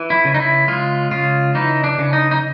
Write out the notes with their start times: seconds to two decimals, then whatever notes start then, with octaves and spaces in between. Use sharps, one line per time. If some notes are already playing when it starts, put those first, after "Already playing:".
Already playing: E3
0.10 E4
0.25 C#3
0.34 D#4
0.40 E4
0.68 G#3 F4
1.11 C#3 F4
1.55 E3 D#4
1.84 D4
1.98 C#3
2.13 D#4
2.31 D#4